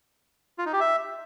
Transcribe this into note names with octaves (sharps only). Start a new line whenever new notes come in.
F4
D#4
G4
E5